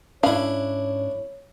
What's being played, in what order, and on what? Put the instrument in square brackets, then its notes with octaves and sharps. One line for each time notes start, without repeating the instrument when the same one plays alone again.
[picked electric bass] G#2 C#4 [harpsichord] D4 E4 [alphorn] C#5 [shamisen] F5